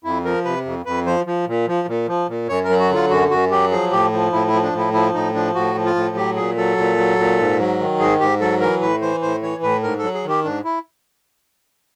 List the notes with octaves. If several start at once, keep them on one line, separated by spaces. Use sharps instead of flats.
F2 E4
F3 A#4
C3 B4
F2
F2 B4
F3 C5
F3
A#2
F3
A#2
F3
A#2
F#2 C#5
A#4
F#3
F#4
D3 F4
F#2 F#4
F#2 F#4
F#3 G4
F3 G#4
A2 G4
F3
A2 E4
E4
F3
D4
A2
E4
F3 E4
A2 D#4
F3 D4
A2 F#4
F3
F4
A2
F#3 G4
A#2 G#4
F#3 A4
A#2
F#3
A#2
G#2
F#3
D#3
G#2 G#4
G#2 G4
F#3 A4
E3 A#4
A2 B4
E3 C5
A2 C5
E3 C#5
A2 B4
G#2 A#4
F#3 A4
G#4
D#3 G4
G#2 D4
E4